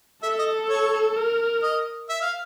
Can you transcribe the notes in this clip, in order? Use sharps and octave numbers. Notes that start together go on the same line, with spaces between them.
A4 E5
D#5
C#5
A#4
D#5
E5
F5